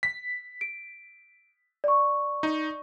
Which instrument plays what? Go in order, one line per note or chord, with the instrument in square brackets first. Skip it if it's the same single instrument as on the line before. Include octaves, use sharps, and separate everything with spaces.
[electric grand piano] B6
[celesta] D7
D5 C#6
[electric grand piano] D#4